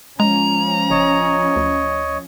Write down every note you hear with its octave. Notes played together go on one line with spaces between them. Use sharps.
F3 G#3 C#4 A#5
F#1 C#5 D#5
D2